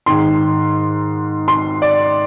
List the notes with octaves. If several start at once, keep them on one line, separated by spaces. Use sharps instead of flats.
G#2 D#3 C6
C6
D5